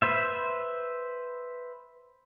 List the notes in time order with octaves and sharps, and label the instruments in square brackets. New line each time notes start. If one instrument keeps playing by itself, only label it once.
[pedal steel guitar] B4 C5 E5